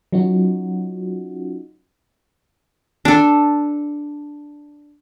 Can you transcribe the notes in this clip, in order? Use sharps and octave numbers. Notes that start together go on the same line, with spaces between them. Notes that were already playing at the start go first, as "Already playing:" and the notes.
F#3 C#4 D#4 F4 F#4
D4 A4